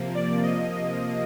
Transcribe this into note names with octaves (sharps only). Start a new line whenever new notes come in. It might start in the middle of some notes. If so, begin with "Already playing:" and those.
Already playing: C3 F3 A#3
D5
D#5